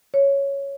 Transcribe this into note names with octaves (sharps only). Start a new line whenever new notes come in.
C#5